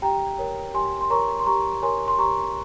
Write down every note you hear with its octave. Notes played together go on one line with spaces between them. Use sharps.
G4 G5 A#5
A#4 C#5
G4 G#5 C6
C6
A#4 C#5 A#5 C#6
C6
G4 A#5 C#6
A#4 C#5 G#5 C6
C6
G4 A#5 C#6